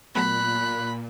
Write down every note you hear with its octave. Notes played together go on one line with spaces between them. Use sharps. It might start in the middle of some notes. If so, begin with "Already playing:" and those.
A#2 F#3 A3 B3 B5 F#6